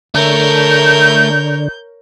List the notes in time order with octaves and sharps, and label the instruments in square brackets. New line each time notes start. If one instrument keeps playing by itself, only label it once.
[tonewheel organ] D3 [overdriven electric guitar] A3 [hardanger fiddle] A#4 C#5 [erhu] G6